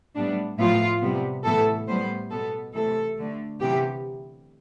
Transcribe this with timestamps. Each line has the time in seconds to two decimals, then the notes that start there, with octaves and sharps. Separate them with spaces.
0.15 A2 G3 B3 D4
0.58 A2 F3 B3 F4
1.01 C3 G3 B3
1.44 A2 E3 B3 A4
1.87 A2 G3 B3 C5
2.30 B2 B3 A4
2.74 C3 E3 A3 A4
3.17 D3 A3
3.60 C3 E3 B3 G4